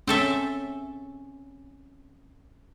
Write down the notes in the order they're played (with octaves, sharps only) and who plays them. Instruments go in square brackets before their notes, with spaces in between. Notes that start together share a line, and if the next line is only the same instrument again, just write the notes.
[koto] C4 A4 E5 [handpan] C#4